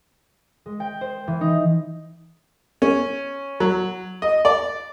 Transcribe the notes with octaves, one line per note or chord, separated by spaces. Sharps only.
G#3
G5
C5
E3
D#4
C#4
F#3
D#5
D5